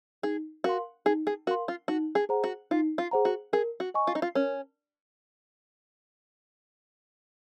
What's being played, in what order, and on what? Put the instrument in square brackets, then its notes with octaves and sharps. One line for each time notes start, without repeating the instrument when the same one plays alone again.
[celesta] D#4 [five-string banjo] G#4
[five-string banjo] F#4 [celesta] A#4 F5 C6
[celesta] D#4 [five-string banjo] G#4
[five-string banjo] G#4
[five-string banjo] F#4 [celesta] A#4 F5 C6
[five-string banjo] F4
[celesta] D#4 [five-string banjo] F#4
[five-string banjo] G#4
[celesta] G#4 C5 F#5 A#5
[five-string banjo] F#4
[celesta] D#4 [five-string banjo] F4
[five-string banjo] F4
[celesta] G#4 C5 F#5 A#5
[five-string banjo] F#4
[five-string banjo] G#4 [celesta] A#4
[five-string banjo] F#4
[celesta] D#5 G#5 C#6
[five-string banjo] F4
D#4
F4
[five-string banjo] C#4 [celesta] A#4